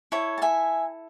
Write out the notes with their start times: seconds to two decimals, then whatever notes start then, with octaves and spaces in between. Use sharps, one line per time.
0.12 E4 A4 C#5
0.38 A5
0.42 E5 G#5